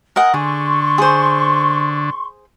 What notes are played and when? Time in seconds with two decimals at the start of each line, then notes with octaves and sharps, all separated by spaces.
0.16 A#4 D#5 F#5 G#5
0.34 D3 G#4 C6 C#6
0.98 G#4 C5